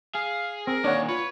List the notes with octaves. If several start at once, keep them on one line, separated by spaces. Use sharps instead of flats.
G#4 F5
C4 A#4
A#2 D#3 D4 C#5 F#5
F4 B4 C#5